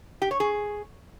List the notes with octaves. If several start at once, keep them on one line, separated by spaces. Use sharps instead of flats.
G4
C#5
G#4